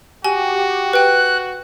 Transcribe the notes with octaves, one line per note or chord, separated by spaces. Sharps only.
F#4 G4 G#5
B4 G5 F#6